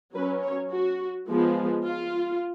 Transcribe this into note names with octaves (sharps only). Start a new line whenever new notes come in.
F#3 C#4 B4
C#5
F#4
F3 G#3 B3
F4